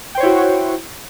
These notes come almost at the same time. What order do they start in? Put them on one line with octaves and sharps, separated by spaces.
G5 C5 C#5 E4 F#4